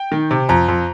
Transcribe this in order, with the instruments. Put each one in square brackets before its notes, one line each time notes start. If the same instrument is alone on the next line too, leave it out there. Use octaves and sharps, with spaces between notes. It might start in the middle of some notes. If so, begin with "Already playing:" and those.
Already playing: [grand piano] G5
D#3
C3
F2 A#5
F2